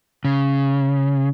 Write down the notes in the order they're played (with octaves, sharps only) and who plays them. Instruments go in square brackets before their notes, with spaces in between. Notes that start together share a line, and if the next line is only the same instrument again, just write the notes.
[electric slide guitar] C#3